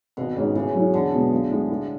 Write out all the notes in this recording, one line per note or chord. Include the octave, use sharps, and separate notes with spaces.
G#1 B2
G#2 G#3 C#4
A2 C#3
F#3 C#4 E4
E2 D3
B2 G#3 B3
B1
A2 G#3
A2